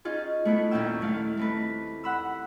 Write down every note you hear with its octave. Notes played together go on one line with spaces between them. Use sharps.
C#4 D#4 F4 G#4
A3 B3 E4
D#2 A#2 A#3 C#4 G5 E6
D#2 A3 E4 F5
A3 C4 B4
F#5 B5 E6